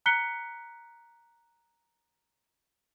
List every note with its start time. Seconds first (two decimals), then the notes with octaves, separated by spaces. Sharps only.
0.06 A#5 F#6 B6 C#7 G7